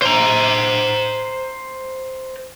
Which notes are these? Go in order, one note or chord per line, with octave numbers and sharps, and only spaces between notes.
C5 A#5